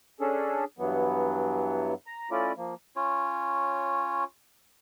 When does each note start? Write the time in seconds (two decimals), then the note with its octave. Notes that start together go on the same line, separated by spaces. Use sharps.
0.20 C#4 D4 G#4 A4
0.79 G2 E3 F#3 B3
2.07 A#5
2.31 A3 C#4 E4 F4 D5
2.57 F3 A#3
2.96 C#4 F4 C#5